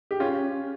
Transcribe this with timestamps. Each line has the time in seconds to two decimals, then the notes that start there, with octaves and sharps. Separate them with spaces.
0.11 G4
0.20 C#4 F4